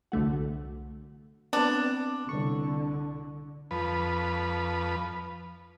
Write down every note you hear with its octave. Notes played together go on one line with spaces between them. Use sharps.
C2 D3 A3 F#4
B3 C4 D4
C2 D3 C#6
F2 B4